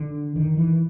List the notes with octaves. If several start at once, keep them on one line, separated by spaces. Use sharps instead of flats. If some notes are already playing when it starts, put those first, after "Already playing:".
Already playing: D3
D#3
E3